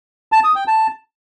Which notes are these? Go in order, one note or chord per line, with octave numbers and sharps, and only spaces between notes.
A5
D#6
G5
A5